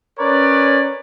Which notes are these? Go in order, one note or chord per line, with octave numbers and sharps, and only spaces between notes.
C#4 A#4 B4 C#5 D5